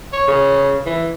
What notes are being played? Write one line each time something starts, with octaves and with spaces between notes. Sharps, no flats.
C#5
C#3
E3